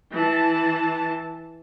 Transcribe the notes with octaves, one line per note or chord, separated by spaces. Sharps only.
E3 A5